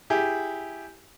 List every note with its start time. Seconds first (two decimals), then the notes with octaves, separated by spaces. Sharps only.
0.10 E4 G4 G#4